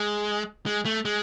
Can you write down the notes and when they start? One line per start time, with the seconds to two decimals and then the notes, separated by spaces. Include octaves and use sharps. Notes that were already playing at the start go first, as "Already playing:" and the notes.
Already playing: G#3
0.66 G#3
0.85 A3
1.05 G#3